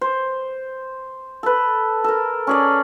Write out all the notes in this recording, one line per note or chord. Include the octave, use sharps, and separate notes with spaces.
C5
A4 B4
A4 A#4
C#4 G#4 D5